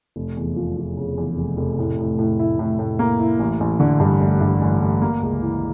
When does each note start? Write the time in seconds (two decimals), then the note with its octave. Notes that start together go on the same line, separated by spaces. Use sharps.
0.16 F1
0.37 E2
0.56 F3
0.77 F3
0.97 C#3
1.17 E2
1.37 F1
1.57 F1
1.78 A2
1.99 A2
2.19 A2
2.39 E4
2.59 A2
2.79 A2
2.99 A#3
3.19 E4
3.39 A1
3.60 A1
3.80 D3
4.00 G2
4.21 A1
4.41 G2
4.61 A1
4.81 A1
5.02 A#3
5.22 C#2
5.41 E3